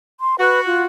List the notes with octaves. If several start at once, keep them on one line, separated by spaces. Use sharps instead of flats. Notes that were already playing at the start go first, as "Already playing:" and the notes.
C6
F#4 B4
F4